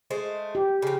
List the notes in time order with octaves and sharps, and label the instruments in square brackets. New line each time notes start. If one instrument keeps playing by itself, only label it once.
[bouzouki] G#3 A3 C5
[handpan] G4
[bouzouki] C#3 F3